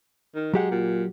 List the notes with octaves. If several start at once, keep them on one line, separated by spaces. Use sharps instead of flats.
D#3
F#3 G#3 G4 F#5
A#2